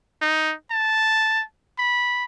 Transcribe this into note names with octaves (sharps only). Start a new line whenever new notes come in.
D#4
A5
B5